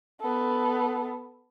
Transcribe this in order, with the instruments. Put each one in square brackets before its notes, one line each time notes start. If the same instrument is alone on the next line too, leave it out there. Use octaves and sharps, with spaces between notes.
[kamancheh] B3 A4